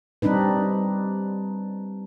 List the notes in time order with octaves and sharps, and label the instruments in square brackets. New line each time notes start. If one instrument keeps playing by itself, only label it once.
[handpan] G3 C4 D4 D#4 B4